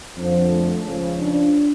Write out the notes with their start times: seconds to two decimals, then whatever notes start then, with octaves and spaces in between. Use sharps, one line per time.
0.17 F2 D3 F3
0.51 A3
0.85 C#2 C#3 F3
1.18 D4